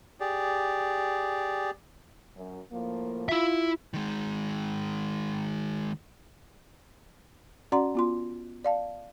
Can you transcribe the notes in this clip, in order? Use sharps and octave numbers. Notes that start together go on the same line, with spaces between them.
G4 G#4 D5
F#2
A2 F3 A#3
E4 F4 E5
D#3 G#3
C#4 F#4 D5 F#5 A#5 C6
B3 F4 C6
D5 F5 A5